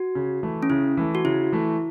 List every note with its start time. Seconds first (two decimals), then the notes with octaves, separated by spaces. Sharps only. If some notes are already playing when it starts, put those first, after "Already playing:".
Already playing: F#4
0.15 C#3
0.43 E3 A3
0.63 C#4
0.70 C#3 E4
0.97 E3 A3
1.15 F#4
1.25 C#3 E4
1.52 E3 A3